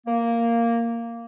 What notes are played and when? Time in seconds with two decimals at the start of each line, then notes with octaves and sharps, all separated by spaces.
0.07 A#3